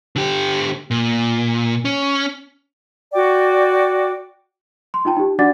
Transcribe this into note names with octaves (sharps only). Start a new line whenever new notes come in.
D3 G4
A#2
C#4
F#4 D5 G5 D6
C6
D#4 F4 G5 A5
D#4 G4
D4 F#4 D5 F#5 D6 A6